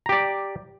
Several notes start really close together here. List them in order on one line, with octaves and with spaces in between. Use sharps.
A#5 G4 D5